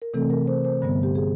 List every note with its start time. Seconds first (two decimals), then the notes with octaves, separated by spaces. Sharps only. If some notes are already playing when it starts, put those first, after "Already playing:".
0.02 A#4
0.14 C3 E3 A3 C4 A4
0.30 A#4
0.47 C5
0.64 C5
0.82 G2 D3 G3 B3
1.03 G4
1.15 G#4